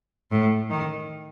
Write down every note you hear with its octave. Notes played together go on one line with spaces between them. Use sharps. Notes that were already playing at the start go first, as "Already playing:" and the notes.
A2
D#3